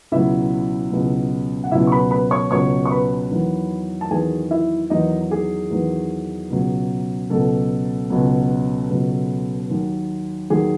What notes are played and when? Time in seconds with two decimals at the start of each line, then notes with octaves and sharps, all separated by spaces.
0.12 C#2 B2 F#3 E4 E5
0.92 C#2 B2 F#3
1.64 F#5
1.71 C#2 B2 F#3 E4 E5
1.87 C#6
1.92 B4 B5
2.11 B4 B5
2.31 C#5 C#6
2.51 C#2 B2 F#3 C#5 C#6
2.85 C#6
2.91 B4 B5
3.31 E2 D#3 F#3
4.01 A5
4.11 E2 D#3 F#3 G#4 G#5
4.51 E4 E5
4.90 E2 D#3 F#3 D#4 D#5
5.31 G#4
5.70 E2 D#3 F#3
6.50 C#2 B2 F#3
7.30 C#2 B2 F#3 A4
8.10 C#2 B2 F#3
8.90 C#2 B2 F#3
9.70 D#2 D#3 F#3
10.50 D#2 D#3 F#3 G#4